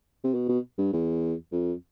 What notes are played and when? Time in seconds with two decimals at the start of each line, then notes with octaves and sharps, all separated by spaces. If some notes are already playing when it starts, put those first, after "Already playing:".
0.24 C3
0.34 B2
0.49 B2
0.78 G2
0.93 E2
1.52 F2